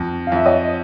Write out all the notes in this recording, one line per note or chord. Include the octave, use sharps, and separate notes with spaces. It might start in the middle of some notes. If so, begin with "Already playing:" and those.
Already playing: F2
F5
F2 E5
C#5 D#5